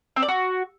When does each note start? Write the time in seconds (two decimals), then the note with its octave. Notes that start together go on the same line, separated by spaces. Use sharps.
0.16 C4
0.22 D5
0.28 F#4